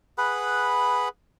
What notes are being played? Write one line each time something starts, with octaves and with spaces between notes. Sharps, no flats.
G#4 B4 F#5 B5